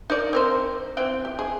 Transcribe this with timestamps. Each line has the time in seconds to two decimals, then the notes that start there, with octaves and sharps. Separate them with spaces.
0.10 D#4 A#4 D5
0.33 C4 A#4 C5
0.97 E3 C4 G5
1.25 G4
1.39 G#4